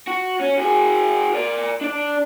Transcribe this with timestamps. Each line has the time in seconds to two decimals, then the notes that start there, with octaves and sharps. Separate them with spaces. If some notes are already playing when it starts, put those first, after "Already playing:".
0.07 F#4
0.40 C#4
0.58 F#4 G#4
1.33 A#4 D5
1.81 D4 D5